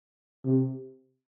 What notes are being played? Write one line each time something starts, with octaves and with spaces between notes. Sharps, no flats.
C3